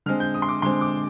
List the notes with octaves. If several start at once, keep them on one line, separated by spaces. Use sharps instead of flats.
D3 G#3 C4 F6
G6
D#6
C6
D6
D3 G#3 C4 C6
D6